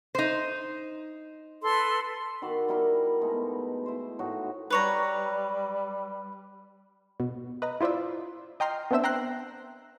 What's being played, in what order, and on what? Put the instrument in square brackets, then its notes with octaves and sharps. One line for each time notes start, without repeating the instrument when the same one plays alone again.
[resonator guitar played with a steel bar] D#4 C5
[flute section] A4 B4 C6
[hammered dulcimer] D#3 F#4 B5 D6
G3 E4 A#4 B5
B2 G#3 A3 D#4
E4 C5
A2 D#4 F#4
[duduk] G3 [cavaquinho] B4 C#5 A#5
[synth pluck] B2
B4 D#5 A#5
E4 F4 C5 D5 E5
D#5 G5 A#5 C6 F6 G6
B3 C4 D4 C5 E5 E6
G5 A#5 C6 F#6